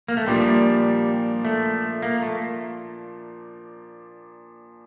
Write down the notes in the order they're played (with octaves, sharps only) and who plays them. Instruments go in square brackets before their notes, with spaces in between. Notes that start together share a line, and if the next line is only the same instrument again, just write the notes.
[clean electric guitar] A#3
A3
[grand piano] A#2 F3 A#3 D4 [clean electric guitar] G3
[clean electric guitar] A3
A#3
A3